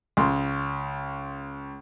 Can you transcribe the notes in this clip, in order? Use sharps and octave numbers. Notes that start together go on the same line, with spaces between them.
C#2 C6